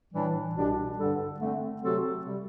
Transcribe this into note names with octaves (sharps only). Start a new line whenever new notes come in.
A2 E3 G3 D4
C2 B2 G3 D4 G4
G2 D3 G3 D4 A4
D3 A3 C4
C3 F#3 C4 F#4 A4
C3 G3